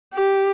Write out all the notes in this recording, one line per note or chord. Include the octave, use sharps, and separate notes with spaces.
G4